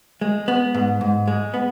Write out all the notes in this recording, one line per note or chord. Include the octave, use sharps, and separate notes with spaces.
G#3
B3
G#2
G#2
G#3
B3